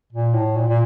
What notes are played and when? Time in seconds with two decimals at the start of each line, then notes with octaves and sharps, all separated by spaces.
0.13 A#2
0.35 A2
0.57 A#2
0.69 A#2